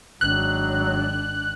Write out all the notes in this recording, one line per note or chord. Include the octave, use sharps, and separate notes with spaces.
G#1 F#3 D4 F#6